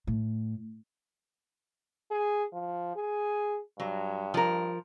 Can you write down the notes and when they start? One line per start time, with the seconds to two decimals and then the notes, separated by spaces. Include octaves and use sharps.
0.07 A2
2.11 G#4
2.53 F3
2.96 G#4
3.80 G2 F#3
4.34 F3 A#4